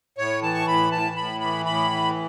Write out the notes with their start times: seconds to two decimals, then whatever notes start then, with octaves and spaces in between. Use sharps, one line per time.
0.18 A2 C#5
0.42 E3 A5
0.55 C#6
0.67 A2 B5
0.91 A2 A5
1.16 A2 B5
1.40 E3 B5
1.66 A2 B5
1.91 E3